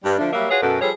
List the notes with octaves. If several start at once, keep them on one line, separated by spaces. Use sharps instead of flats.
G2 G3
D3 F3 A3 D4
F#3 G3 A#3 E5
F4 F#4 G#4 B4 C#5
F#2 B2 A4
F3 G3 G#4 A4 B4 C#5